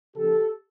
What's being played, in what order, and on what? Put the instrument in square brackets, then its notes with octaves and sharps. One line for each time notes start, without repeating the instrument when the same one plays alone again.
[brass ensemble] C#3 F3 A#3 G4 A4